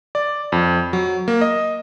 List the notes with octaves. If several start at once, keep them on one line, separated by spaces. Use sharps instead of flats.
D5
F2
F#3
A#3
D#5